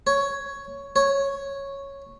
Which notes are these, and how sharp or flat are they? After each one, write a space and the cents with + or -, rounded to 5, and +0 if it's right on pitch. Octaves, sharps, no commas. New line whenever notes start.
C#5 +5
C#5 -5